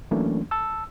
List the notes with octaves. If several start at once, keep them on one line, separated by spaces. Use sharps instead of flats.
E3 F#3 A3 A#3 C#4 D4
A5 E6